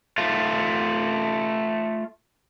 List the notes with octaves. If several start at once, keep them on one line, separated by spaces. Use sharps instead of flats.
A3 F4